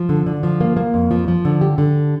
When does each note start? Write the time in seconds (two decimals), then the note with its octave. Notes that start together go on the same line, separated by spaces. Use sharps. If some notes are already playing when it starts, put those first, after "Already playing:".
Already playing: F3
0.09 D3
0.26 D3
0.43 F3
0.61 A#3
0.77 A#3
0.94 F2
1.11 F3
1.28 F3
1.45 D3
1.61 G4
1.78 D3